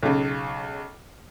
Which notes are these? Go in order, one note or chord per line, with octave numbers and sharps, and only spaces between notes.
B1 C#3